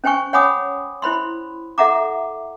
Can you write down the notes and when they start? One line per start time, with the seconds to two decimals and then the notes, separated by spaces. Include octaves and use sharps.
0.04 C#4 C5 G5 G#5 C#6
0.33 C#5 F#5 G#5 B5 D6 D#6
1.02 E4 C5 B5 C6
1.78 A4 E5 F#5 A#5 D6